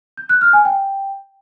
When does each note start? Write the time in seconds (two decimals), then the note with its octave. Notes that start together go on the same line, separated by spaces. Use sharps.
0.17 G6
0.29 F#6
0.41 F6
0.53 G#5
0.65 G5